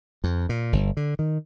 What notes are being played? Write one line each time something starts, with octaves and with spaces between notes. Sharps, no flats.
F2
A#2
G1
D3
D#3